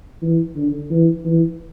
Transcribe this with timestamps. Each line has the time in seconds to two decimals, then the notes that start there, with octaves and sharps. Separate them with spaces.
0.22 E3
0.56 D3
0.91 E3
1.25 E3